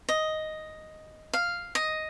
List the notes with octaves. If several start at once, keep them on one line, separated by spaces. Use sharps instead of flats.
D#5
F5
D#5